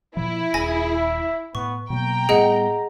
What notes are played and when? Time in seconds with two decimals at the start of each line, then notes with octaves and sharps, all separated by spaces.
0.17 A#2 F3 E4
0.54 D#1 G#4 G#5 A#6
0.96 E5
1.55 A2 B3 C#6
1.90 B2 F#3 A#3 G5 A#5
2.29 A2 G3 B3 G#4 D#5 F#5